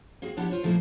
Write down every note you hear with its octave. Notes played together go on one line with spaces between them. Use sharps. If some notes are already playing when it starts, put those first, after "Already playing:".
A#3 C4 F#4 G#4
F3 B3 D4 E4 G4 F#5
F4 C5 C#5
A#2 F3 A3 A#3 E4 C5